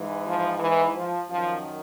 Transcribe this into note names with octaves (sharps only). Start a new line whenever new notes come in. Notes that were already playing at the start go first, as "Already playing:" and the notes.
Already playing: G#2 E3
F3
E3
F3
F#2 D#3 F3